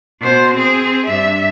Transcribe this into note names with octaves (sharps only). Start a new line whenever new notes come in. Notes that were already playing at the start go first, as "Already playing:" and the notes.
B2 C5
C4 G#4
G2 E5